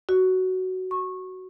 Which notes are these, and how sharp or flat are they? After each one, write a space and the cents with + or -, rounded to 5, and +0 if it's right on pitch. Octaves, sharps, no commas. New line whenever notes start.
F#4 +10
C#6 -20